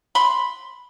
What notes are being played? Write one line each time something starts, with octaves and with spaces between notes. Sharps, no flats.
B5 C6